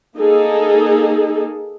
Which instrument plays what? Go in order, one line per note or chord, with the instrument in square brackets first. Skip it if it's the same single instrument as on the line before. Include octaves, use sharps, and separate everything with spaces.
[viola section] A#3 D#4 G#4 A4